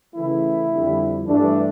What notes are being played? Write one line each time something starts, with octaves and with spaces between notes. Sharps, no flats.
C#3 E3 A3 E4
F2 D3 G3
G2 E3 A3 D4